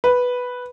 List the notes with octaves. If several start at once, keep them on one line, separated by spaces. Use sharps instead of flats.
B4